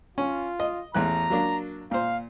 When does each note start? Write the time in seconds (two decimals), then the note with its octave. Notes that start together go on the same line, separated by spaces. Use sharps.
0.18 C#4 F4
0.60 D#5
0.95 A1 E2 A#5 F#6
1.30 F#3 A#3 D4
1.91 A#2 C5 F5